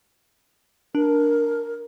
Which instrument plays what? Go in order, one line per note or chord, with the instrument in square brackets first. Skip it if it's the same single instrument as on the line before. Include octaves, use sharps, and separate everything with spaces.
[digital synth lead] D4 [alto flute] A#4